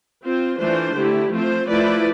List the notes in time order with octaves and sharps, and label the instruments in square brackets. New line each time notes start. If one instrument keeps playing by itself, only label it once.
[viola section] C4 F4 C5
E3 A3 D4 F4 C5
D3 A3 E4 G4
F3 A3 C4 F4 C5
F3 A3 E4 B4 D5